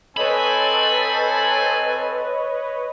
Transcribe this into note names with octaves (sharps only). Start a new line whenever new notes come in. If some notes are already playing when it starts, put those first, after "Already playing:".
C4 A4 B4 C#5 D#5 G#5 B5